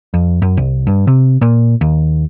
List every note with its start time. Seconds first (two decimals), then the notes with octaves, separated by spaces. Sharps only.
0.14 F2
0.42 F#2
0.57 C2
0.87 G2
1.07 C3
1.41 A#2
1.81 D#2